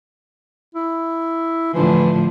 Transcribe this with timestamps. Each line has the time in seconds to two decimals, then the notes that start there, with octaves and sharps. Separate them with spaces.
0.75 E4
1.74 A2 D3 E3 F3